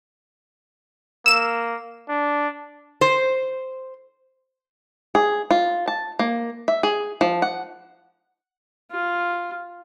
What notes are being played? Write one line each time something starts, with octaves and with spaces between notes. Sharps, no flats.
A#3 E6 E7
D4
C5
G#4
F4
A5
A#3
E5
G#4
F3
F#5
F4